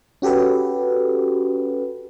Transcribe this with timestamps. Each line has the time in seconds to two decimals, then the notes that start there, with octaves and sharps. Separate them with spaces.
0.22 C#4 F#4 G4 A4 B4